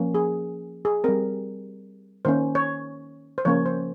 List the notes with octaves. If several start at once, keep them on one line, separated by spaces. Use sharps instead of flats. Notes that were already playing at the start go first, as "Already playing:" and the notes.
Already playing: F3 A#3 C#4
G#4
G#4
G3 C4 A#4
D#3 A#3 C#4 C5
C#5
C5
C#3 F3 A#3 C#4 C#5
C5